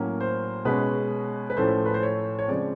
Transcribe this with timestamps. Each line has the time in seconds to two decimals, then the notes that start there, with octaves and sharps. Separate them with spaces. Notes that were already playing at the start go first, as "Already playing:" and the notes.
Already playing: A2 F#3 A#3 C#4
0.21 C5
0.65 B2 G#3 C#4 B4
1.50 B4
1.57 A2 F3 A3 C#4 C5
1.86 B4
1.94 C5
2.03 C#5
2.39 C#5
2.48 C#3 F3 G#3 C4 D5